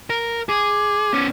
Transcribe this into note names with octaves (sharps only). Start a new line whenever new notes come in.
A#4
G#4 D6
B3 C#4